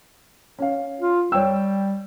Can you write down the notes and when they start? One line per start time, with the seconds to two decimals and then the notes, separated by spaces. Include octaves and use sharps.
0.59 C#4 F5
1.00 F4
1.32 G3 C#5 G5 E6